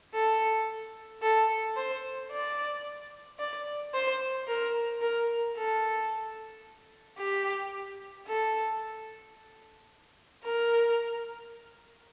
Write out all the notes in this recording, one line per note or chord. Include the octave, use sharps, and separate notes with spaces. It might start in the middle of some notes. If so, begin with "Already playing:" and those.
A4
A4
C5
D5
D5
C5
A#4
A#4
A4
G4
A4
A#4